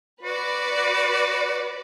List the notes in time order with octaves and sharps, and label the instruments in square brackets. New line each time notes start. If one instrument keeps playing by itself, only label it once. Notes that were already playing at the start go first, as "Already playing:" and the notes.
[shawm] F#4 [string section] B4 D5